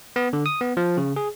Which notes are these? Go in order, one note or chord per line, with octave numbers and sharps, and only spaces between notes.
B3
D3
D#6
B3
F3
C#3
G#4